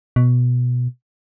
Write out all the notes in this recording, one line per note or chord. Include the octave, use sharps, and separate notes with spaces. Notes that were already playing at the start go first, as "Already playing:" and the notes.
B2